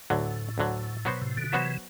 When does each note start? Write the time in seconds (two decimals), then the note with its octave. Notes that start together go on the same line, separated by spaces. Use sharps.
0.10 D2 A2 D3 F#3
0.58 D2 D3 F#3
1.05 B2 F#3 B3 F#4 C5
1.21 A2 C3
1.37 B2 D3
1.52 C3 E3 F#3 B3 F#4 C5